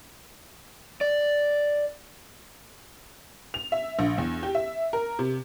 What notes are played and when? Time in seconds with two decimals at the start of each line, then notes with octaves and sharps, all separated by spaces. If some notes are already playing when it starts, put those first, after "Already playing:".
1.01 D5
3.54 F7
3.72 E5
3.99 A#1
4.18 E2
4.43 G4
4.55 E5
4.93 A#4
5.19 C3